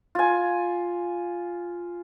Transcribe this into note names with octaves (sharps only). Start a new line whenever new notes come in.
F4 G#5